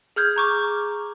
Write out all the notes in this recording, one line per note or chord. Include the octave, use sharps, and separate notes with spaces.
G#4 F6 G6 G#6
A#5 C#6 D6